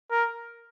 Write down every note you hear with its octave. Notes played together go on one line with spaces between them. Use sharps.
A#4